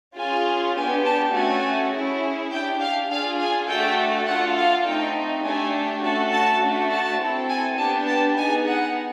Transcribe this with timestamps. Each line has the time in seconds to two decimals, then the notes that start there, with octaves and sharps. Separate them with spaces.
0.18 C#4 F4 G#4 G#5
0.77 B3 D4 G4 G#5
1.06 A5
1.36 A3 C#4 F#4 A4 G#5
1.95 C#4 E4 G#4
2.53 D4 G4 G5
2.82 F5
3.11 D4 F4 G#4 F5
3.41 G#5
3.69 A3 D4 F#4 A4 G5
4.28 D4 F4 A4 F#5
4.57 F5
4.86 A3 C4 D#4 G5
5.45 A3 D4 G4 G#5
6.03 A3 C#4 F#4 A4 A5
6.33 A5
6.62 A3 D4 F#4
6.91 A5
7.20 C4 E4 A4
7.50 G#5
7.79 B3 D4 G4 A5
8.08 A5
8.37 B3 D#4 G#4 G#5
8.67 F#5